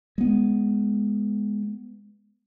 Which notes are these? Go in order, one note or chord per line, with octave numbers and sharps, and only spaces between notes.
G#3 B3